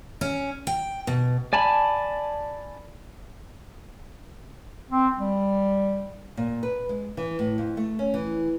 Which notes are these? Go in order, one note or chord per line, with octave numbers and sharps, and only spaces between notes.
C#4
G5
B2
D5 G#5 A5 B5
C4
G3
A#2
B4
G#3
E3
A2
F2
A3
C#4
E3